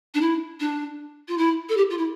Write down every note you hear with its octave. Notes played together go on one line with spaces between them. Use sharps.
D4
E4
D4
F4
E4
A4
G4
F4
E4